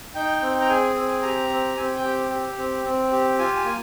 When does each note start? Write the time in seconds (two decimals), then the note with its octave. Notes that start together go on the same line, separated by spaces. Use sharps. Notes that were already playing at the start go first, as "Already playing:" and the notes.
0.15 D#4 G5
0.41 C4
0.61 A#5
0.68 G#4 G#5
0.96 C4
1.22 G4 A#5
1.50 C4
1.77 C4 G#5
1.95 G5
2.04 G4
2.31 G4
2.58 C4
2.85 C4
3.12 G4
3.39 F4 G#5
3.57 G#5
3.65 A#3